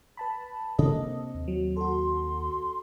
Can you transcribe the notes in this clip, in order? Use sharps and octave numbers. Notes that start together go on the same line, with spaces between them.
B4 A5 B5
C3 A#3 D4 A4 D#5
D#2
F#3
F#4 A4 C6